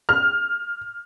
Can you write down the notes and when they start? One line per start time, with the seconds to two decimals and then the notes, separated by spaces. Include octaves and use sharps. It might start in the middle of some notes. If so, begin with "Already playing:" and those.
0.09 F6